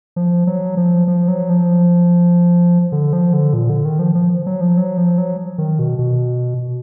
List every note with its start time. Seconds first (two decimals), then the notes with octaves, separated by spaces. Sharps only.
0.16 F3
0.47 F#3
0.77 F3
1.08 F3
1.28 F#3
1.50 F3
2.92 D3
3.13 F3
3.33 D3
3.53 A#2
3.70 D3
3.85 D#3
3.99 F3
4.15 F3
4.46 F#3
4.61 F3
4.77 F#3
4.97 F3
5.18 F#3
5.58 D#3
5.79 B2
5.99 B2